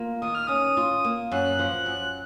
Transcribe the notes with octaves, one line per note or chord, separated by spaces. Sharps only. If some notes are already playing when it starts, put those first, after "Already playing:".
Already playing: A#3 F4
D#3 D#6
F6
C#4 D#6
F4
A#3
F#2 F#6
F3
F#2